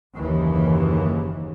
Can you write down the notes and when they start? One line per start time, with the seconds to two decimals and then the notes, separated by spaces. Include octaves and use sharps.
0.16 F#1 D#2 E3